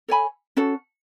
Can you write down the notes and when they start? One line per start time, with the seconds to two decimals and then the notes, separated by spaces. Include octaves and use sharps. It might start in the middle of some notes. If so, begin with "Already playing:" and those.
0.08 A4 C#5 G#5 B5
0.57 C#4 F#4 A4